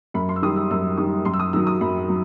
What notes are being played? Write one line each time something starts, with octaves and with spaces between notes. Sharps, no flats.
F#2 B5
C6
E6
D#3 G3 D#6
E6
F#2 E6
D#3 G3 D#6
F#2 C6
E6
D#6
D#3 F#3 E6
D#6
F#2 B5
F#3